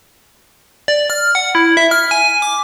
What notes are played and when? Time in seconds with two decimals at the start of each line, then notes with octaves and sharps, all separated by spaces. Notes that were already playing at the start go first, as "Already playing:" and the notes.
0.88 D5
1.10 F6
1.35 F#5
1.55 E4
1.77 E5
1.91 F6
2.11 G#5
2.42 D6